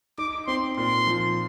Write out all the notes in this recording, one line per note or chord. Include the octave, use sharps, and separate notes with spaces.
D#4 D6
C4 C6
A#2 C6
F3